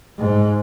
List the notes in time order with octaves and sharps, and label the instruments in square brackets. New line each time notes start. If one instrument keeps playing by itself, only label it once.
[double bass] G#2